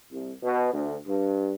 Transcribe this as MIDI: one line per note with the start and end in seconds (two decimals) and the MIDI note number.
0.12 0.32 36
0.43 0.71 47
0.73 0.95 38
1.07 1.54 43